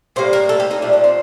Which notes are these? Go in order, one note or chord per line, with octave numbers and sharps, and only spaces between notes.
A2 G3 A#3 C5
A#4
A4
G4
D#4
A#2 F3 A3 D4
D4
C4